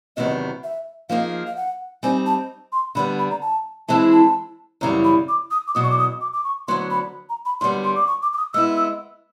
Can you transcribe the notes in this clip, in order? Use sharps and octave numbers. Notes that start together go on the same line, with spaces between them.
E2 C3 D#3 F#3 B3 D#5
E5
F3 A#3 D#4 G#4 F5
F5
F#5
G3 C4 D#4 G#5
A5
C6
D3 G3 B3 B5
B5
A#5
A5
E3 G#3 C4 E4 G#4 A5
A5
F#2 C#3 E3 G3 B3 A#5
B5
D6
D#6
D6
E2 B2 F#3 D#6
C#6
D6
D#6
D6
D6
C#6
D2 D3 F#3 B3 C6
B5
A#5
B5
F#2 D3 G3 B3 C6
C6
D6
C#6
D6
D6
D#6
G#3 B3 E4 E6
E6